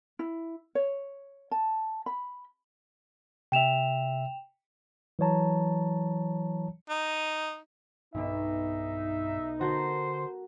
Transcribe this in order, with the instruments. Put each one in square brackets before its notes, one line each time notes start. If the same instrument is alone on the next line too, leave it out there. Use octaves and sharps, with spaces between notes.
[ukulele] E4
C#5
A5
B5
[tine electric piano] C3 E5 [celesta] G5 E7 F7
[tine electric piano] E3 F#3 C#5 A5 A#5
[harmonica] D#4
[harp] B1 B2 [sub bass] G2 [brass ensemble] D#4 [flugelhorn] E5
[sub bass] D3 [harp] F#4 A4 A#4 [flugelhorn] C5